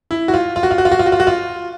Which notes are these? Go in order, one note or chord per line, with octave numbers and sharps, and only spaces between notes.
E4
F#4
F4
F4
F#4
F4
F#4
F4
F#4
F4
F#4
F4
F#4
F4